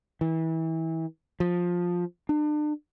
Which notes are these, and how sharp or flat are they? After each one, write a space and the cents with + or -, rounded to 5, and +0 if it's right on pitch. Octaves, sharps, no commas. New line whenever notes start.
E3 -30
F3 +15
D4 +40